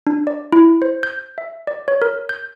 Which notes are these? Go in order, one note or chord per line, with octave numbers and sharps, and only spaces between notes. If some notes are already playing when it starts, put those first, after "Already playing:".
D4
D5
E4
C5
G6
E5
D5
C#5
A#4
G6